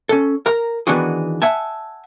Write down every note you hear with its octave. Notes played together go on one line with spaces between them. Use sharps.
C#4 A4
A#4 A#5
D#3 E3 B3 D4 F#4 G#4
E5 F#5 G#5 A5